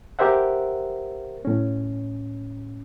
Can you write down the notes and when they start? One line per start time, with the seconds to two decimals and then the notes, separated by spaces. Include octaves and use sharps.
0.19 G4 A#4 C5 E5 F#5
1.45 A2 C#4